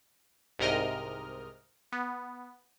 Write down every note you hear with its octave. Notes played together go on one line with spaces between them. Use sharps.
C2 G#2 C3 A#4 D#5 F6
B3